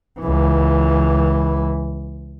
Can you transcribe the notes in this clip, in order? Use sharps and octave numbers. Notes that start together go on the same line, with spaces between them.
C#2 E3